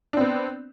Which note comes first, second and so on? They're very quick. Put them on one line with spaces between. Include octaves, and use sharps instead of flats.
D4 C4 B3